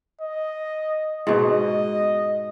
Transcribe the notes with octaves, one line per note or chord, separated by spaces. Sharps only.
D#5
G#2 B2 D#5